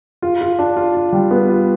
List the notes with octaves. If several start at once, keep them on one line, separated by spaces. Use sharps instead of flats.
F4
F4
D4
F4
F4
G3
B3
F4